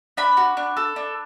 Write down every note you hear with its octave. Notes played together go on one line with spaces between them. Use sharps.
D4 B5
F#4
D4
A4
D4